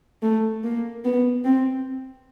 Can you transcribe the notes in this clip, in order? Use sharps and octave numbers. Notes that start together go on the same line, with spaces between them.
A3
A#3
B3
C4